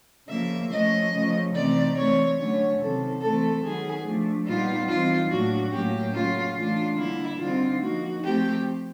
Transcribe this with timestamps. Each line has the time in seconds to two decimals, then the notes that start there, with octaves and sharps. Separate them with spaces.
0.28 C#3 F3 A#3 E5
0.70 F3 A3 C#4 D#5
1.12 C#3 F3 A3 C#4
1.54 C3 E3 A3 C4 D#4 D5
1.96 E3 A3 C4 C#5
2.37 D3 F#3 A3 C#4 C#5
2.79 C3 D#3 F#3 A4
3.21 E3 A3 C4 A4
3.63 D#3 F#3 B3 G#4
4.04 F3 A3 D4
4.46 A#2 G3 B3 D#4 F4
4.88 E3 G3 C4 D#4 F4
5.30 A2 F#3 A#3 D4 F#4
5.72 A2 F#3 A#3 C#4 G4
6.14 C#3 F#3 A#3 C#4 F4
6.55 E3 A3 D4 F4
6.97 D3 G3 A#3 E4
7.39 D3 G3 C4 D#4 F4
7.80 F3 A#3 D#4 F#4
8.23 F3 A3 C4 G4